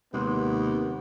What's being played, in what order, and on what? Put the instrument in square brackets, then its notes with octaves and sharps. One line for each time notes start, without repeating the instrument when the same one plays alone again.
[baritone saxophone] D#2 [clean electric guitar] C3 G#3 [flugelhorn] B3